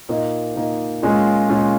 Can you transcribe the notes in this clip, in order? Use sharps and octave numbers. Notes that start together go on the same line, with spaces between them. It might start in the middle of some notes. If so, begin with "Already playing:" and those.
A#2 A#3 D#4 D#5
A#2 A#3 D#4
A#2 G#3 C#4 F4
A#2 G#3 C#4 F4